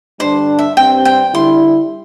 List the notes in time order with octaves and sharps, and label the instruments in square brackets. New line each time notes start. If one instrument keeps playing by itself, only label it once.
[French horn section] G2 D3 G3 D4 [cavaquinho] C5
[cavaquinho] E5
[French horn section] G2 G3 C4 [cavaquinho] G5
[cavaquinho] G5
[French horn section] D3 G3 E4 [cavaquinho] C6